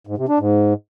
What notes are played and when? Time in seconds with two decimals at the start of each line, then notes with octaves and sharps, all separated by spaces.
0.07 G#2
0.18 C3
0.29 D4
0.39 G#2